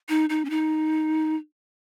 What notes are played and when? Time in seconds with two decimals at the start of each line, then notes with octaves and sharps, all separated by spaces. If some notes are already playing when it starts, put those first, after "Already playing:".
0.09 D#4
0.30 D#4
0.45 C#4
0.50 D#4